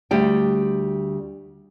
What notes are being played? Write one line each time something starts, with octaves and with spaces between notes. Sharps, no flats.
D2 G3 G5